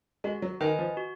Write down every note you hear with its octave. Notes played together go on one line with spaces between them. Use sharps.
G#3 F#4
F#3
D#3 B4 D#5 G#5
F3
F#4